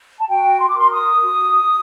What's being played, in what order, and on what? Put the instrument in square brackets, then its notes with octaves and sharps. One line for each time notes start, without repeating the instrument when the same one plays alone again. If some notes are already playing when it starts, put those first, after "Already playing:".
[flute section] A5
F#4 G5
C6
D6
A#4 C6
D#6
F#4